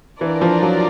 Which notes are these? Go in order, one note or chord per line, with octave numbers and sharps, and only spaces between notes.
E3 D4 F4 A#4 D5
F3
F#3